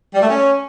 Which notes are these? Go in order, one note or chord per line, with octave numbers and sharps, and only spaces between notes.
G3
A3
C#4